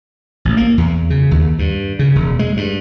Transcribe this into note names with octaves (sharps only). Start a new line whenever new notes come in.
A1
A#3
E2
C#3
D#2
G2
C#3
E1
G#3
G2